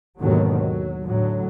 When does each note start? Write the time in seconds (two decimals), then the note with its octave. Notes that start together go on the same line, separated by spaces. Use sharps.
0.19 D#2 G#2 B2 D3 D#3 F#3
0.52 F#3
1.06 A2 D3 F#3